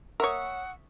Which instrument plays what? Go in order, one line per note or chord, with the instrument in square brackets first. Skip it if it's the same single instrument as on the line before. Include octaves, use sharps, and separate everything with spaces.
[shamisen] A#4 C#5 [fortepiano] E5 C#6 D#6 [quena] F#5